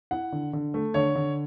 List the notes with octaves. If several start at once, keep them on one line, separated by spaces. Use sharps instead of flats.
E4 F#5
D3
D3
A3
D3 C#5
D3